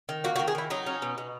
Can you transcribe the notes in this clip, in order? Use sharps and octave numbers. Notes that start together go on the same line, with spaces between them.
D#3
A#3 F#4
F#4
D#3
G#4
D#3 E4
F#3 D#4
C#4
B2
B2